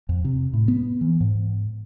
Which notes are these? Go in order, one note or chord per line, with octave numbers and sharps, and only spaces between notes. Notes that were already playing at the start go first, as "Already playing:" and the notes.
F2
C3
A2
B3
E3
G#2